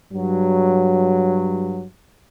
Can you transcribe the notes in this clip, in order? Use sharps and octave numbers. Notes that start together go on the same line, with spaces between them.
G2 F#3